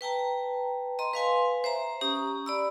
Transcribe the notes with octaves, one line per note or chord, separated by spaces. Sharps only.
B4 G5 A5 A#5
D#5 A#5 C6
B4 F5 G#5 C6
C5 E5 A#5
C#4 G4 A#5 D#6
D5 B5 E6